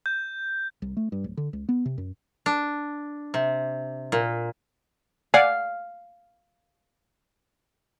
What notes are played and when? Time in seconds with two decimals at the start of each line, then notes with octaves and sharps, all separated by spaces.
0.06 G6
0.82 C2
0.97 A3
1.12 G2
1.24 D1
1.37 D3
1.53 C#2
1.69 B3
1.85 C3
1.98 F#2
2.46 D4
3.34 C3
4.12 A#2
5.34 D5 F5 F#5 G#5